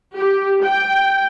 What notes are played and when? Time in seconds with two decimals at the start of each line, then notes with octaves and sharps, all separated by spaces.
0.17 G4
0.63 G5